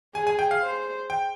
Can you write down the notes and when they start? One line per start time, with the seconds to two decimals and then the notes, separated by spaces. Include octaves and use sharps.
0.15 G#4 G#5
0.27 G#5
0.39 G5
0.51 F5
0.62 C5
1.10 G5